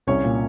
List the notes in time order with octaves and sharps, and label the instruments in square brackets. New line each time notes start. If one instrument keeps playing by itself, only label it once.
[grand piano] C2 [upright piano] C#4 C#5
[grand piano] A#2